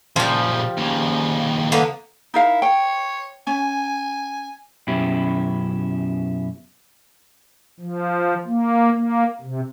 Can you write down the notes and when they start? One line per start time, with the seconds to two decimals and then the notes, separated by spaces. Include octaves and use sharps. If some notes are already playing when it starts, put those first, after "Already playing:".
0.16 A#2 C#3 F3 G3
0.77 D#2 C#3
1.72 D3 A#3 B3
2.34 D#4 E4 A#4 F5
2.62 C#5 G5
3.47 C#4 G#5
4.87 F#2 B2 C#4 E4 G4 B5
7.80 F3
8.46 A#3
8.92 A#3
9.41 C3